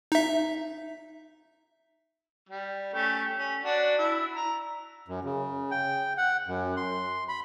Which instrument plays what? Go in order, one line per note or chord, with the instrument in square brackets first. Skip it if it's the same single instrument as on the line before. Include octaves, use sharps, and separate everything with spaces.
[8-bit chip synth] D#4 E5
[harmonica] G3
A3 C#4 G4
C#4
D4 F#4 D5
E4
A#5
[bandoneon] F#2
C#3
G5
F#5
F#2
C6
B5